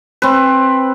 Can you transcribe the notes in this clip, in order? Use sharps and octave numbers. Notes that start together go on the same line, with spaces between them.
C4 B4